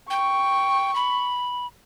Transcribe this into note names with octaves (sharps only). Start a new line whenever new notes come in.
G5 C#6
B5